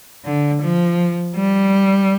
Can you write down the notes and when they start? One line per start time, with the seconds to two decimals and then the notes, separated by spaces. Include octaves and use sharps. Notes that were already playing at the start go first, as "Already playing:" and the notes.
0.25 D3
0.62 F3
1.36 G3